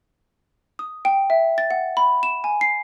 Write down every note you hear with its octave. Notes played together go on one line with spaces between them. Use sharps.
D#6
G5
E5
A6
F#5
B5
E7
G#5
C7